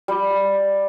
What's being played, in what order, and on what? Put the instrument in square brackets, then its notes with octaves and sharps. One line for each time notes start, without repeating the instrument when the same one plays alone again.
[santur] G3